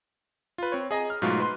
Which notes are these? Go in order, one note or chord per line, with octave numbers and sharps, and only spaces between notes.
F4 B4
C4 C#5
G#4 D#5 G#5 A#5
F6
G#2 B2 F#3 A3 F4 F#4
B4 C6